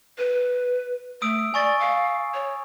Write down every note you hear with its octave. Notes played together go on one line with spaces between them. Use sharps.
B4
A3 D#6 E6 D7
D5 G#5 C#6 A6
F5
C#5